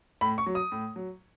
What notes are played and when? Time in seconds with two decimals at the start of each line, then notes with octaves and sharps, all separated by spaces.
0.21 A2 B5
0.38 C#6
0.46 F#3
0.55 D#6
0.72 A2
0.96 F#3